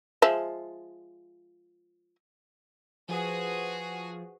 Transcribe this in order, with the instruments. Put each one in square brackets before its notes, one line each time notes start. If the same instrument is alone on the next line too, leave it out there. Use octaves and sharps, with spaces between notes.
[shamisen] F3 G#3 E5
[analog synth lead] F3 [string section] F#4 G#4 [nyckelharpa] B4 C5